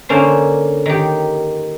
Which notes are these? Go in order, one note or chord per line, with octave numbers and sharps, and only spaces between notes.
D3 A#3 C#4 C5
D#3 G4